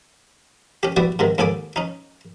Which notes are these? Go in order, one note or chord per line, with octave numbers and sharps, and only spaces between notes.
C#4 G4
G3 B3 E4 F#4 D5
G#2 C3 D#3
D#2 G#2 A4 G#5 D6
C#4 D#4